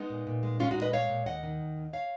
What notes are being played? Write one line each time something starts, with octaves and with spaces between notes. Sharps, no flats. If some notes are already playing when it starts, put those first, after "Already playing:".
Already playing: G#3 B3 D#4
A#2
A#2
G#3
G#3 C#4 F4
D#4 F#4
A#2
B4 D#5
G#3 C#5 F5
A#2
D#2 D#5 F#5
D#3
D#2
D#2
C#5 F5